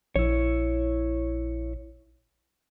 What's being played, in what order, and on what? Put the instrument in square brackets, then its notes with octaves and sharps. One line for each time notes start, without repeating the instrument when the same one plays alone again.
[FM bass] A#1 [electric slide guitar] E4 C#5